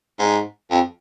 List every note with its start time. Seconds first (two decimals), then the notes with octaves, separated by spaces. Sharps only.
0.19 G#2
0.71 F2